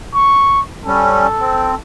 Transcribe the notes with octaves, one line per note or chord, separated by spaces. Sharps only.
C#6
G3 C#4 A4
C4